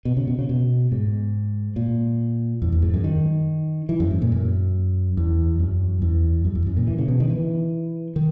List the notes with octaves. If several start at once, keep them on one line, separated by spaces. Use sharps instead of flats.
B2
C#3
B2
C#3
B2
G#2
A#2
E2
E2
G#2
F#2
D#3
E3
F#2
G#2
A#2
F#2
E2
F#2
E2
F#2
E2
F#2
A#2
E3
C#3
B2
D#3
E3
D#3